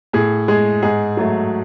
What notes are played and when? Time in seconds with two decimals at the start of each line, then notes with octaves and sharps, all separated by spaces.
0.13 A2 G#4
0.48 G#3 G#4
0.83 G#2 G#4
1.17 F#3 A3